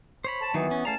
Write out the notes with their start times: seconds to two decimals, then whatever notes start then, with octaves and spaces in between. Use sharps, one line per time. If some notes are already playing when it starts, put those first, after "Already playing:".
0.24 C5 C#5 B5
0.41 A5
0.54 D#3 E3 F#3 B3 D#4
0.71 C#4
0.85 E2 A3 C#4 F5 A5 A#5